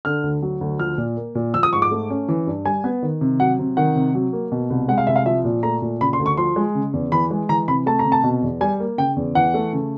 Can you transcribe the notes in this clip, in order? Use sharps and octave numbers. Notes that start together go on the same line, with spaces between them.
D3 F6
D2
F#3
D2
F3 F6
A#2
A#3
A#2
F3 E6
D#6
G#2 C#6
D6
A3
C#4
E3
G2
G3 G#5
B3
D#3
C3
F#3 F#5
C3
D#3 F#5
C3
F#3
A#3
B2
C2
G#3 F#5
F5
C2 E5
F5
F3 E5
A#2
A3 A#5
A#2
C#3 B5
C6
D2
C#6
F3 C6
G#3
C#3
E2
E3 B5
G#3
E3 A#5
C3 B5
A3 A5
A#5
C3
A5
B2
E2
G3 G#5
A#3
C#3 G5
E2
E3 F#5
A3
C#3